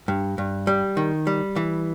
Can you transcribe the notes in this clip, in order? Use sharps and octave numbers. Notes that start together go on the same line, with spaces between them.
G2
G2
G3
D#3
G3
E3